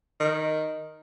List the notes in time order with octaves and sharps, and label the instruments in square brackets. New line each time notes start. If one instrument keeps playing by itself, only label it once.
[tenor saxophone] D#3